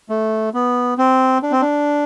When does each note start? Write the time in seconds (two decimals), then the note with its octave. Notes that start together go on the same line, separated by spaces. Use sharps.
0.09 A3
0.54 B3
0.98 C4
1.43 D4
1.52 C4
1.61 D4